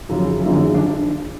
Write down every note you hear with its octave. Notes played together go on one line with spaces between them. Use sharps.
F#2 C#3 F3
G#1 F#2 D3 F3 G#3
D4